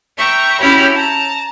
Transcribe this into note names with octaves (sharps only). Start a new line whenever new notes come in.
E5 G5 A#5 C#6
C#4 E4 F#4 G4 C#5 B5
A5 A#5